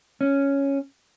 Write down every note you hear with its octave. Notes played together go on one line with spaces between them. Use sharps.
C#4